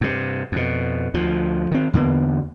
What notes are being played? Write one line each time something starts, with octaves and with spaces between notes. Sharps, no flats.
G2 C3
F2 B2
D2 F3
D#3 C4
E2 D3 A#3 B3